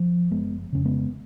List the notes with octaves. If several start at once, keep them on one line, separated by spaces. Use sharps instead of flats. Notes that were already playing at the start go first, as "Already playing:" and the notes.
Already playing: F3
F#1 G#3 B3
F2 C#3 C#4
G#3 B3